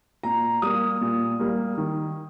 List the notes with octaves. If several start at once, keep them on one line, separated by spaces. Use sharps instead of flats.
A#2 A#5
G3 A#3 D#6
A#2
G3 A#3
D#3